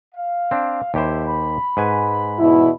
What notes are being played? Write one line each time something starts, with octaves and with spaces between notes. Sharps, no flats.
F5
C4 D4
D#2 E4 G4 C5
B5
G#2 B4 G#5
E2 B2 E4